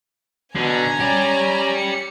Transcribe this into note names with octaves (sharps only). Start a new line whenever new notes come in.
B2 D3 G#5 A#5
C#4 G4 D5
C#7